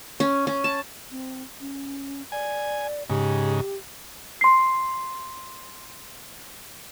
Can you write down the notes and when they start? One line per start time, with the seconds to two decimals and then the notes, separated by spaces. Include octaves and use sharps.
0.20 C#4
0.47 C#4
0.64 A5
1.11 C4
1.61 C#4
2.32 D5 G#5
3.10 G#2 C#3 G4
4.41 C6 C7